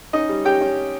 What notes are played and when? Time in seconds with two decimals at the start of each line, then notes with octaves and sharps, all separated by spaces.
0.13 C#4 D#4 D#5
0.29 G3
0.45 C#4 G4 G5
0.61 C#4